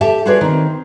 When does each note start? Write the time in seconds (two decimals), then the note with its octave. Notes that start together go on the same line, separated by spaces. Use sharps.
0.01 G4 A4 E5 G5 A5
0.26 F4 F#4 G#4 B4 C#5 D5
0.41 D#3 C4